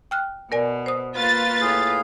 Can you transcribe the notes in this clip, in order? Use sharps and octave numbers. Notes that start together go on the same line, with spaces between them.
G5 F6 F#6
B2 A#4 D5 G#5
C5 D#6
A#3 F4 B4 F6 A6
A2 G#4 F5